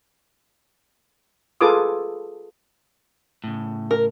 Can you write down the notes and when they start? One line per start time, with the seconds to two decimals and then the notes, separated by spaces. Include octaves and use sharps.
1.61 F4 G#4 A4 B4 D6 D#6
3.44 A2 C#3
3.91 A#4